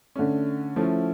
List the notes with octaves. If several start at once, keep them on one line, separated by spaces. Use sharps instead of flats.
D3 A3 C#4
F3 A3 C#4 E4